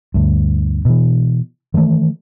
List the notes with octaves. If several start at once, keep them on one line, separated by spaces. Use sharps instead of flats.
D2 G2
B2 E3
D#3 E3 G3 A3